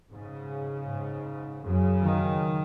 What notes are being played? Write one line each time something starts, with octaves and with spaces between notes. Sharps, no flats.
G#2 C#3
G#2
F#2 C#3
D#3